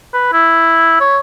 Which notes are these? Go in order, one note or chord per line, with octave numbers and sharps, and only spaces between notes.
B4
E4
C#5